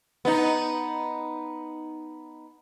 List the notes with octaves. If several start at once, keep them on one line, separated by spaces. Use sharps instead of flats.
B3 D#4